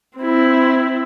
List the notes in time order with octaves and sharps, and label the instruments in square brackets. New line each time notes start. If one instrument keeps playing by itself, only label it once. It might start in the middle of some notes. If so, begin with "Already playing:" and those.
[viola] C4 E4